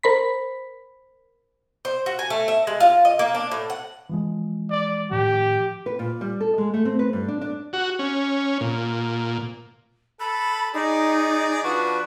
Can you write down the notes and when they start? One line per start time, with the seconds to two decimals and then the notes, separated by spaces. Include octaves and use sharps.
0.03 A#4 C5 B5 B6
1.85 C5
2.06 F#4
2.19 G#5
2.30 A3
2.48 E5
2.67 G#3
2.80 F4
3.05 D#5
3.19 A#3
3.35 D4
3.51 A2
3.70 F#5
4.09 E3 F3 G#3
4.71 D5
5.11 A2 D#3 F3 G4
5.86 B4
5.99 A#2
6.21 G3
6.40 A4
6.58 G#3
6.74 A3
6.85 C4
6.99 B4
7.13 G2
7.28 D4
7.41 D4
7.73 F#4
7.99 C#4
8.61 A#2
10.20 A4 B5
10.74 D#4 G#4 D5
11.64 F3 D4 F#4 B4